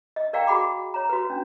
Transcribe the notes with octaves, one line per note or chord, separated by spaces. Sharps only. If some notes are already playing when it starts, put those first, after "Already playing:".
D#5
A#4 D5 F5 G5 A#5
F#4 G#4 F#5 B5 D6
C#5 A#5
F#4 B4
C#4 D4